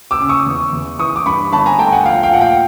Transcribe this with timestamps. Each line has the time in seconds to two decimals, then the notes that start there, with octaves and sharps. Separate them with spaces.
0.11 D6 E6
0.20 C#3
0.29 C#6 D#6
0.47 E2
0.73 E2
0.99 E3 C#6 D#6
1.16 D6
1.26 G2 B5 C#6
1.52 G1 A5 B5
1.66 G#5 A#5
1.79 A3 G5 A5
1.92 F#5 G#5
2.05 F3 F5 G5
2.23 F5 G5
2.32 A#2 F#5
2.41 F5 G5